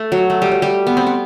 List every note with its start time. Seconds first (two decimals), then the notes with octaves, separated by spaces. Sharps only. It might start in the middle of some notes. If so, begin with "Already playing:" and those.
Already playing: A3
0.12 F#3
0.30 A3
0.42 G3
0.51 F#3
0.62 G3
0.87 B3
0.97 C4
1.07 B3